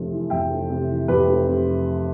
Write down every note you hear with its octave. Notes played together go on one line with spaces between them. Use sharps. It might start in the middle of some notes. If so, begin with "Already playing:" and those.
Already playing: F1 F2 C3
E3
F2 E5 G5
F1
C3
E3
F2 G4 B4
F1
C3